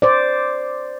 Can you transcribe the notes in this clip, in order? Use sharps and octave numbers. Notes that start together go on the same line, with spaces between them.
C5 D5